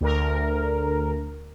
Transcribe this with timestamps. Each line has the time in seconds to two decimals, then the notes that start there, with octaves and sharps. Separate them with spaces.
0.01 D2 A#4